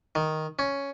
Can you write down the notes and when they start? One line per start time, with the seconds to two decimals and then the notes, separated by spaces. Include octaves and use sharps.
0.15 D#3
0.59 C#4